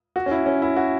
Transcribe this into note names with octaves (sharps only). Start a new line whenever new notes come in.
F#4
C#4
E4
C#4
E4
F#4